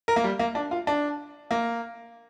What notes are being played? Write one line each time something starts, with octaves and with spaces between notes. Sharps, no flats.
A#4
A#3
G3
A#3
D4
F4
D4
A#3